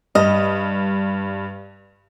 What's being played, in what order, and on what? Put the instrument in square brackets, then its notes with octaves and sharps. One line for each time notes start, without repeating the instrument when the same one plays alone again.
[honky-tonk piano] G2 [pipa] D#5